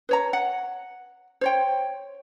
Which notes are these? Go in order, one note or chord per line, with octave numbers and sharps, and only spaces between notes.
B4 C#5 A#5
F#5
C5 C#5 G5